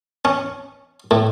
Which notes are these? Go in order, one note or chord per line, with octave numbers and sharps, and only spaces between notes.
C#4
A2